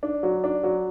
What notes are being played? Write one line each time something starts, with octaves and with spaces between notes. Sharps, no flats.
D4
F#3
D4
F#3